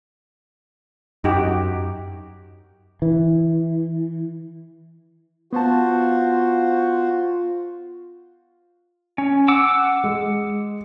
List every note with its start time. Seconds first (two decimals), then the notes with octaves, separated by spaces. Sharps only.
1.24 F#2 D#4 F#4 G4
3.02 E3
5.53 B3 F4 F#4 C5 A5
9.18 C#4
9.48 F#5 D6 E6
10.04 G#3